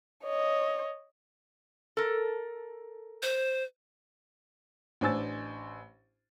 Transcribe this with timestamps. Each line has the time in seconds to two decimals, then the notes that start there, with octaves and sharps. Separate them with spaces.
0.24 C#5 D#5
1.97 A4 A#4
3.23 C5
5.01 A1 D4 C5 G#5 E6 A6